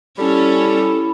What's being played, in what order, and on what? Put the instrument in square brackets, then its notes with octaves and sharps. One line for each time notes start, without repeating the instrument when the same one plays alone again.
[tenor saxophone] G3 [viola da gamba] C#4 [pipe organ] E4 [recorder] A4